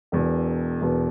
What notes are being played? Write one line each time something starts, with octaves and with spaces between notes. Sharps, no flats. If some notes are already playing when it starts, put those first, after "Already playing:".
E1 E2 B2
E1 E2 B2